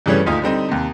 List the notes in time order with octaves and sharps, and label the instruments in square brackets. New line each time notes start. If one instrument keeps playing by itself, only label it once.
[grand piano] G2 C#3 E3 G3 A3 C#4
D#1 D2 D#4 F4 D#6
D3 G3 C4 D#4
D#2 C3